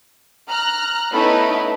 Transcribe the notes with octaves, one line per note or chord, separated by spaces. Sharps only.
A#5 F6 F#6
A3 B3 C#4 D#4 E4 B4